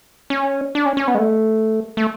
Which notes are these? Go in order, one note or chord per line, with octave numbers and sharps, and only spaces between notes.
C#4
D4
C#4
C#4
B3
G#3
A3
A3